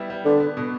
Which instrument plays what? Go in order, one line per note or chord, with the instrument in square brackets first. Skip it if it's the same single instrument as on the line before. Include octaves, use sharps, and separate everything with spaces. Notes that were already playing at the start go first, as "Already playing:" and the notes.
Already playing: [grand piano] G3 B3 E4
G3
[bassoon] D3 [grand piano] B3
[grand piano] B3
B2